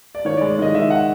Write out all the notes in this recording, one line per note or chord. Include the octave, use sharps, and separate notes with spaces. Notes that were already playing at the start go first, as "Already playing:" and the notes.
D5
D#3 C#5
D5
G#3
D5
D#3 D#5
D#3 E5
F#5